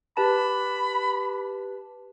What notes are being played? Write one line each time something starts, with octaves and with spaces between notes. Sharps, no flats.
G4 B4 A5 B5